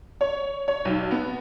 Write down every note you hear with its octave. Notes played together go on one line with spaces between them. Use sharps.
C#5
C#5
B1
B3